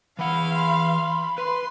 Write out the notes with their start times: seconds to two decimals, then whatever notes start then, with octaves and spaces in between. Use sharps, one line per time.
0.19 E3 F5 F#5 B5
0.54 B5 C6
1.38 B4 C6